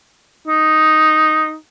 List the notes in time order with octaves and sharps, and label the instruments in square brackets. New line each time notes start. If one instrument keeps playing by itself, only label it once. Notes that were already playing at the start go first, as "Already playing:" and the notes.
[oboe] D#4